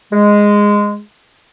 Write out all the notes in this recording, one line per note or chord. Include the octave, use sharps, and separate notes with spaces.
G#3